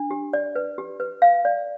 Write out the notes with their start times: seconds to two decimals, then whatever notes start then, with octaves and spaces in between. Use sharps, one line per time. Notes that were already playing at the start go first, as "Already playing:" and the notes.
Already playing: D4
0.11 G4
0.33 D5
0.55 B4
0.78 G4
1.00 B4
1.22 F5
1.45 D5